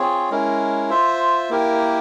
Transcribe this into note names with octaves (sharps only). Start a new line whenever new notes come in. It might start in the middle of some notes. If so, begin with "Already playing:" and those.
Already playing: C4 F4 G#4 C#5
G#3 C#4 E4 A#4
F4 C5 E5
A#3 E4 G4 A#4